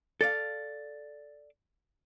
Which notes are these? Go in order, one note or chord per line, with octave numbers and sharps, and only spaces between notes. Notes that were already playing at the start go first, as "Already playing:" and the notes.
A4 D5 F5 A6